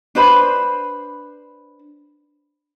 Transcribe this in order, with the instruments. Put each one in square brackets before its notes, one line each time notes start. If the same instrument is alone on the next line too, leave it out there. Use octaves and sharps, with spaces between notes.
[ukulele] D4 B4 C5 B5